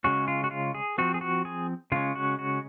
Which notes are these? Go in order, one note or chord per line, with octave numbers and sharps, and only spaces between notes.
C#3 G#3 C#4 F#4
F4
F#4
F4
G#4
F3 C4 F#4
G#4
F#4
G#4
C#3 G#3 C#4 F4
F#4
F#4